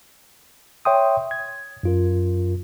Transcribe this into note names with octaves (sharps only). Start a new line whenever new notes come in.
C#5 E5 G5 C6 D#6
G#6
F#2 F4 A#4